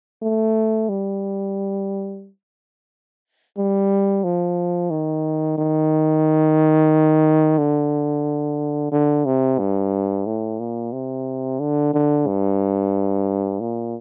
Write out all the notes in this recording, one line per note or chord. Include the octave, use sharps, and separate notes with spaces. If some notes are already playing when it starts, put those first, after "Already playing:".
A3
G3
G3
F3
D#3
D#3
D3
D3
C3
G2
A2
A#2
C3
D3
D3
G2
A#2